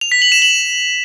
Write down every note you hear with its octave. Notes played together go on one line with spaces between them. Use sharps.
F7
B6
F#7
E7
F#7